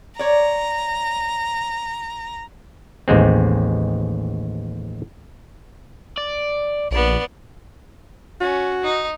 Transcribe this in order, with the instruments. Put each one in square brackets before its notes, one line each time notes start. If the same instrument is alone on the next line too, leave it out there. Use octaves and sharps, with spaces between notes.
[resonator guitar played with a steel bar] C#5 D5 [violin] A#5
[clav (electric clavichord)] A1 D#2 G#3 C4
[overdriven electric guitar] D5
[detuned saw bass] A#1 [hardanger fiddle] B3 D5
[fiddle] C#4 [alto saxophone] F#4
[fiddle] D#4